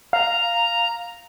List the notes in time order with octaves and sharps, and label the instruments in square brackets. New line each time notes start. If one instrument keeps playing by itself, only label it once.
[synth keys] F5 [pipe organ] A#5